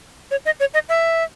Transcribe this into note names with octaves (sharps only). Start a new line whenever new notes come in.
C#5
D#5
C#5
D#5
E5